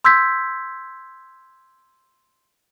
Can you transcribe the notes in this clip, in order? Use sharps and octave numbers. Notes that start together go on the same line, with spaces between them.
C6 E6 G6 G#6 B6